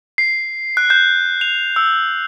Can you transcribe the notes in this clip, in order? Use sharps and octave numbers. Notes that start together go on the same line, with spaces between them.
C7
F#6
G6
F7
E6